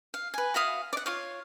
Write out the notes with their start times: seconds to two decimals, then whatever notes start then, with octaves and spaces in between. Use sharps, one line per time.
0.14 F5
0.34 B4 G#5
0.54 F#4 E5 F5 D#6
0.93 D5 F#5
1.06 F4 C#5 F5